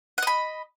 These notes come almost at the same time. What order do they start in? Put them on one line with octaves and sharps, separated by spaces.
F#5 D#5 B5